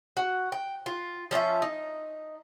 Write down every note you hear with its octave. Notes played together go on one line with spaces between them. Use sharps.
F#4
G5
F4
F3 C#4 F4 E5
D#4